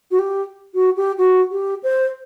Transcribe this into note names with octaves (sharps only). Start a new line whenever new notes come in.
F#4
G4
F#4
G4
F#4
G4
C5